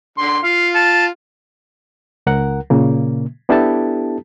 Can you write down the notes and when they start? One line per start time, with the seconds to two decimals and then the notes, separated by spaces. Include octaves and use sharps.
0.18 D3 C6
0.43 F4 F5
0.75 A5
2.27 C#2 A#4 F#5
2.70 A#2 C#3 A#3
3.49 B3 D4 E4 G4 A4 A5